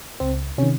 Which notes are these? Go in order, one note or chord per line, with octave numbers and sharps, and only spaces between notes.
C#2 C4
C3 D#3 C#4